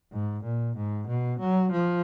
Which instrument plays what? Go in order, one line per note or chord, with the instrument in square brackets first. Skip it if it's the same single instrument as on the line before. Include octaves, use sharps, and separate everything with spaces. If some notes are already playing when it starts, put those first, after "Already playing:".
[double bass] G#2
A#2
G#2
B2
F#3
F3